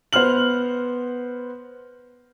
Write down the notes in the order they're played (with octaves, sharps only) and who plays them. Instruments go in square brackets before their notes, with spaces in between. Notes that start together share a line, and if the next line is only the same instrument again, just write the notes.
[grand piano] B3 C5 F#5 F6 F#7